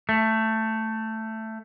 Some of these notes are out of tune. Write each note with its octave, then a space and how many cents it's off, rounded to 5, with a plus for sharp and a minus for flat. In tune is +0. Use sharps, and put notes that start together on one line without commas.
A3 +10